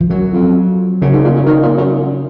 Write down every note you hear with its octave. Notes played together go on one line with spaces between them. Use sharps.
F3
F#2 F#3
F2
F#2 C#3
G#2
A#2
F#2
D#3
A#2
F#2